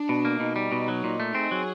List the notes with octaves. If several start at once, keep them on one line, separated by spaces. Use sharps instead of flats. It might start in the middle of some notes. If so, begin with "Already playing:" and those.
Already playing: D4
B2
A#3
B2 D#4
G3
B2
F#3
A#2
A3
C4 G#4
F#3